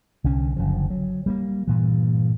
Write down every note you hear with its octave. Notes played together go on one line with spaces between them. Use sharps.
C2 D3 C#4
F#1 D3 F3
F#3
G3 A3 A#3
G2 A#2 E3